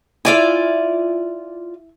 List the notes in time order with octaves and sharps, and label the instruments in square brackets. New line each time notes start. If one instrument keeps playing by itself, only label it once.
[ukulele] E4 E5 [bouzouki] F4 D5 G#5